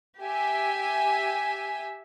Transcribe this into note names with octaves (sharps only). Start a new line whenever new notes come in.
G4 E5 G#5